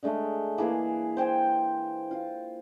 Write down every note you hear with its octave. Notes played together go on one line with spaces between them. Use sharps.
D3 G#3 A3
E3 A#3 G#4 B4
C5 G5 G#5
F4